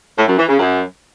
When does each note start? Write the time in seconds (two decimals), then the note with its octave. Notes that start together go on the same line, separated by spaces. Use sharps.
0.17 A2
0.27 F#2
0.38 E3
0.48 C#3
0.59 F#2